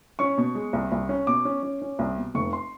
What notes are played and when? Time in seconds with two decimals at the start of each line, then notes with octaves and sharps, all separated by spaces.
0.19 C#4 C#6
0.38 B2
0.55 G#3
0.73 C2
0.92 C2
1.09 C#4
1.27 B2 D6
1.45 C#4
1.63 C#4
1.82 C#4
1.99 C2
2.17 B2
2.35 F1 C#6
2.53 C6